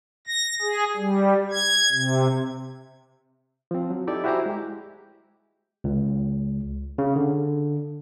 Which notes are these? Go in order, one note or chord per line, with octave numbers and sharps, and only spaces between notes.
A#6
G#4
G3
G#6
C3
F3 C4
F#3
D#4 E4 G4 A4 D5 E5
E4 F#4 G4 C5 G#5 A#5
G#3 G4
C#2
C#3
D3